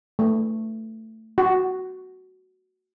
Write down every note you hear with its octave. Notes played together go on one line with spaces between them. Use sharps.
A3
F#4